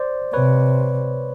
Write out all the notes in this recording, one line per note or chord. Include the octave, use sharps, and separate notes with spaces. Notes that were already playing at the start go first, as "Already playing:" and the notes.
Already playing: C5 D5
C3 B4 C#5